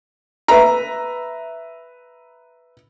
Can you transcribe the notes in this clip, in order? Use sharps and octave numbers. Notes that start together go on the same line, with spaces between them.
B4 E5 A#5